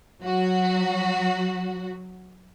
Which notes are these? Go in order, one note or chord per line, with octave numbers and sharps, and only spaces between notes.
F#3 F#4